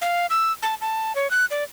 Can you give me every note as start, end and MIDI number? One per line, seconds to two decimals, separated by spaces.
0.02 0.26 77
0.30 0.52 88
0.62 0.75 81
0.81 1.15 81
1.15 1.30 73
1.31 1.45 90
1.51 1.64 74